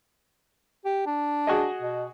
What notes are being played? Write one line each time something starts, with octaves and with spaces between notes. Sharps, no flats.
G4
D4
F#4 G#4 D#5
B2